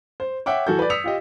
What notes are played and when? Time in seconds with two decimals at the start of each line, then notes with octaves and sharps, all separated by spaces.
0.20 C5
0.46 C#5 E5 F#5 G5 D6
0.67 E3 F#4 A4 G6
0.79 B4 D5
0.90 D#6 E6 B6 C#7 F7
1.04 F4 G4 D#5